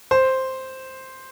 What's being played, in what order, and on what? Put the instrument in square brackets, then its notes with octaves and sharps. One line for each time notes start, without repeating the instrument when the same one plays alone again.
[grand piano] C5